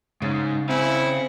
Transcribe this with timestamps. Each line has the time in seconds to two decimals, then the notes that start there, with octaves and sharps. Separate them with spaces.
0.22 C#3 G#3 D#4
0.69 C4 E4 F5 G#5